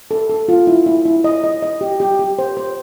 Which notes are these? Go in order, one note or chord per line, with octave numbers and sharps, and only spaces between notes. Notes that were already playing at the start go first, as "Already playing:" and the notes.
A4
A4
F4
E4
E4
E4
D#5
D#5
D#5
G4
G4
G4
C5
C5